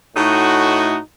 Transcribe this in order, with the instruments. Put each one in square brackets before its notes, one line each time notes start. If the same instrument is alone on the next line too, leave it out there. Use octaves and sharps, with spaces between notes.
[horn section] A2 D#4 F#4